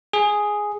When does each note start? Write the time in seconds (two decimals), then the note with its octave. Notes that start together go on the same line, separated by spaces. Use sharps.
0.13 G#4